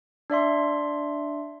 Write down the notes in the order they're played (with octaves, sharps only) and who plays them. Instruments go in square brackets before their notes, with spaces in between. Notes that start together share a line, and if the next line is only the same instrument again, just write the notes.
[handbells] D4 D5 E5 C6